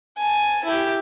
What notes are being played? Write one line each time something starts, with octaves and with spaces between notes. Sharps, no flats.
G#5 A5
E4 G4